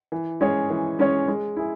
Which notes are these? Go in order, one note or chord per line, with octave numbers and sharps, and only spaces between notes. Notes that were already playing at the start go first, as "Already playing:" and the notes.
E3
G#3 C#4 G#4 C#5
E3
G#3 C#4 G#4 C#5
G#3
E4 G#4